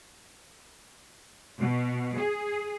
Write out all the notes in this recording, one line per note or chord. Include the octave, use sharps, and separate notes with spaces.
B2
G#4